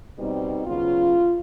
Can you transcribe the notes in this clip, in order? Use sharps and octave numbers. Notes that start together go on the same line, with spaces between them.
B2 G3 C4 D#4
C#3 F#3 B3 F4